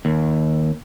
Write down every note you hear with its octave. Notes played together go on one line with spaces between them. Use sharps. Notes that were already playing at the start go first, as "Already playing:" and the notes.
D#2